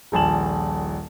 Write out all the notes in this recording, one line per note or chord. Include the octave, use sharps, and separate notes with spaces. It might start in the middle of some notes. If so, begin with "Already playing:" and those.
D#1 A#1 G#5 A5 E7 F#7